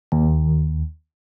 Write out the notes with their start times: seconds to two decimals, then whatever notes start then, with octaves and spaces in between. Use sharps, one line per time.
0.12 D#2